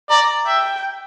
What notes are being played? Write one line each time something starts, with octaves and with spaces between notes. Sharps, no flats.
D5 A#5
E5 G5